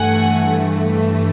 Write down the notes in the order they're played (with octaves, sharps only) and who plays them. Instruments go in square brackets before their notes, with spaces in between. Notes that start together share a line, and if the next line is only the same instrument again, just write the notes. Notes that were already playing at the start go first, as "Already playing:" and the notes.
Already playing: [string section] G2 E3 A3 F#5 G#5